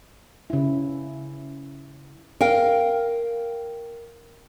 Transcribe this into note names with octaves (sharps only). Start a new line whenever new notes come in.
C#3 E4
A#4 F5 G5